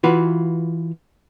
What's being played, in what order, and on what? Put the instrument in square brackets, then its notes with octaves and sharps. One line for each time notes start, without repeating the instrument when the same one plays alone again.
[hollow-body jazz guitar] E3 F4 F#4 B4